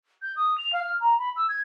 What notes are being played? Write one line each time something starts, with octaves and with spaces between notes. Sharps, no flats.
G6
D#6
F7
F5
F6
A#5
B5
E6
G#6